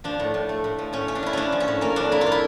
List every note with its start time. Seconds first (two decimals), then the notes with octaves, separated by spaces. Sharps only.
0.04 F3 D4
0.20 A2
0.34 A2
0.49 A3
0.64 A2
0.79 F3
0.93 A2 C#4
1.08 A3 C#4
1.15 D4
1.23 F3 E4
1.33 F3 C#4 D4
1.52 F3
1.60 C#4
1.68 A2
1.81 A#3 C#4
1.96 F2 D4
2.12 A#3 E4
2.21 F4
2.26 A#3
2.32 E4